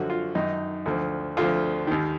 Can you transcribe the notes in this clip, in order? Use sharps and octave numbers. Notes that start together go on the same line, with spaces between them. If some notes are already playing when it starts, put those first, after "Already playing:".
Already playing: F#2 D3 F3 F#3 F#4
F4
F#2 D#3 D#4
D2 D3 F3
D2 D3 F3 F4
D#2 D#3